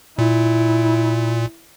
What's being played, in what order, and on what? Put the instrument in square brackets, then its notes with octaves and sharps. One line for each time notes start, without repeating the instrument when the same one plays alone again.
[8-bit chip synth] A#2 [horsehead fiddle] E4